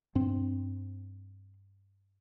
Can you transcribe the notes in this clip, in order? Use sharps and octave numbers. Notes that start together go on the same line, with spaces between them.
G2 C4